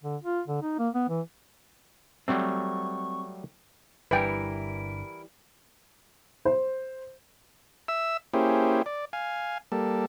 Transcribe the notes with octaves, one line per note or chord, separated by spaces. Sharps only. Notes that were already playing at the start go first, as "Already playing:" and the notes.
D3
F4
D3
D#4
A#3
B3
E3
F#3 G3 A3 C4 C#6
G1 G2 E3 G3 E4 A#4 B4 G5
C5
E5 E6
A#3 C#4 E4 G4 G#4 C5
D5
F5 G#5
G3 A#3 A4